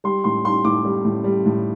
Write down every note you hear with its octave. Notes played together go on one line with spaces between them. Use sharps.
G3 C6
A2 C6
G3 C6
A2 D6
G3
A2
G3
A2